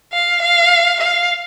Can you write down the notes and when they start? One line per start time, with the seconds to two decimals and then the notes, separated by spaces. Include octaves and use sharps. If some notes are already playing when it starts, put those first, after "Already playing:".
0.13 F5
0.42 F5
1.00 F5